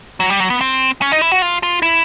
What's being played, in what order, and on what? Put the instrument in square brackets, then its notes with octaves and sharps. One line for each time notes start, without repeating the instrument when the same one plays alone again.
[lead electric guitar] F#3
G3
F#3
B3
C4
C#4
D#4
E4
F#4
F4
F4
E4